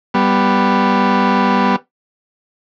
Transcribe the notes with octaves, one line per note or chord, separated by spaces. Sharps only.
G3 B3